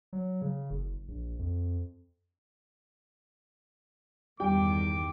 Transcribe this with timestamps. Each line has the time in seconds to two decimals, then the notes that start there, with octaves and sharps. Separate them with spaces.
0.13 F#3
0.42 C#3
0.70 F#1
1.08 A#1
1.39 F2
4.40 E2 G2 D#3 G3 G5 D6